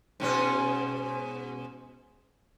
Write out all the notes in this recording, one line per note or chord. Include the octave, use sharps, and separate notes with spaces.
G#2 B2 C#4